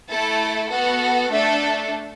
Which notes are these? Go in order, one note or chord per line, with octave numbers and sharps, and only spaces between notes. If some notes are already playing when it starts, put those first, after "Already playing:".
A3 E4 A4 A5
B3 F#4 A4 F#5
A3 D4 A4 E5